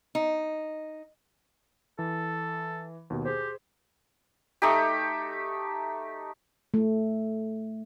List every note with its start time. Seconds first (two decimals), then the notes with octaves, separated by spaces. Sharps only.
0.15 D#4
1.99 E3 A4
3.10 D#2 B2
3.25 G4 G#4 C5
4.62 A3 D#4 G4
6.74 A3